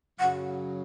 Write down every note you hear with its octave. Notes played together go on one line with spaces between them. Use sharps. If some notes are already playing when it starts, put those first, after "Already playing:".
F#2 C#3 F#3 F#5